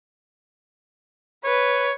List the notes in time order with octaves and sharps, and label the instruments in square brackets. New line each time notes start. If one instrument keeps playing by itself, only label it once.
[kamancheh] B4 [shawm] C#5